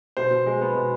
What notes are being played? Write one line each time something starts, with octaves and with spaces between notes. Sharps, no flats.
B2 C5
B2
G#3
B3
B2